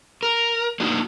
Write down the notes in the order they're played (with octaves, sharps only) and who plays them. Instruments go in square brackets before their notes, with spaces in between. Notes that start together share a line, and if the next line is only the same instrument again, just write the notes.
[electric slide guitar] A#4
A#3 D4 D#4 F#4